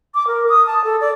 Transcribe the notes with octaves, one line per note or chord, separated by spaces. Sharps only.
D6
A#4
D#6
A5
A4
D5